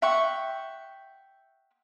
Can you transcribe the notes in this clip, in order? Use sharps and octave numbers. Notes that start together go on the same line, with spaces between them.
E5 F#5 G5 C#6